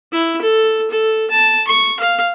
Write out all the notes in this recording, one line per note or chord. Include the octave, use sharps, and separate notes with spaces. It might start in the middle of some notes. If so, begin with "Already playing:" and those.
E4
A4
A4
A5
C#6
F5